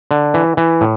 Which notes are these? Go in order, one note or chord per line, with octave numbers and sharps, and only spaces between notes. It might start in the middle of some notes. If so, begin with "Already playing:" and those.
D3
E3
E3
A2